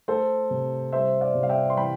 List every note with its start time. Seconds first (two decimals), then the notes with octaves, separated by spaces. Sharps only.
0.08 A3 A4 C5
0.51 C3
0.93 G3 C5 E5
1.21 D5 F5
1.35 C3
1.43 F5
1.49 E5 G5
1.70 C6
1.77 E3 G5 B5